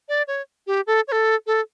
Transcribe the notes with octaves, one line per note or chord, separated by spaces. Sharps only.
D5
C#5
G4
A4
C#5
A4
A4